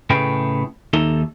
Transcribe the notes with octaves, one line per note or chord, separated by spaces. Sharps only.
A2 C#3 A3 G#4 B4 G5
D#2 D#4 A4 E5